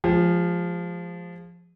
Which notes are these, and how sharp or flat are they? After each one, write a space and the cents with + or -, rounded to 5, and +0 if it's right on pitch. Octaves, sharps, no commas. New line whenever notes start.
F3 +0 G#3 +25 G#4 -40